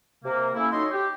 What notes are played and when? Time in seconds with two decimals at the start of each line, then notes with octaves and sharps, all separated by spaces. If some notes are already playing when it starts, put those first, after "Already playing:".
0.24 C3 A#3
0.55 A3 A#3 C#4 E4
0.72 F#3 D#4 A4 C#5 D#5 C6
0.92 G4